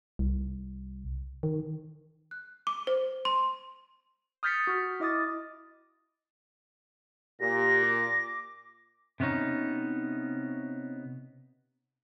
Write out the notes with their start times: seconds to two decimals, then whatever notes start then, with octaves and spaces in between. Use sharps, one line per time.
0.19 C2
1.43 D#3
2.31 F#6
2.67 D6
2.87 C5
3.25 C6
4.43 D#6 F6 G6 A6 B6 C#7
4.67 F#4 F6
5.00 E4 D#5 D6 D#6 A6
7.40 A#2 G4 A#6
7.83 D6
9.20 C3 B3 C#4 D#4